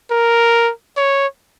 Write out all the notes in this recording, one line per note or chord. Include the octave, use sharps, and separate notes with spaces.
A#4
C#5